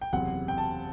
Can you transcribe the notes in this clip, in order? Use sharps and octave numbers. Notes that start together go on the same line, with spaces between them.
G5
F#1 E2 C3 F#5
G5
A5